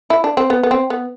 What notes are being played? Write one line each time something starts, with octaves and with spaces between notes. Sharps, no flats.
E4
D4
C4
B3
B3
C4
B3